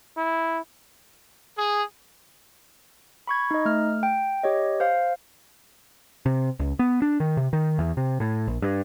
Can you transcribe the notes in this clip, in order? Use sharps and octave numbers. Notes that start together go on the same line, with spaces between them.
E4
G#4
B5 C#6 G#6
D#4 D#5
A3 F6
G5
G4 C#5 D#5
C5 F5
C3
C#2
B3
D4
D#3
C3
D#3
E2
C3
A2
A#1
G2